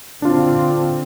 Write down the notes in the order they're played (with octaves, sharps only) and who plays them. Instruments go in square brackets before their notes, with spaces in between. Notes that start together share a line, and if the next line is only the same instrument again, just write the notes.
[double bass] D3 C4 [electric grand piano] D4 F4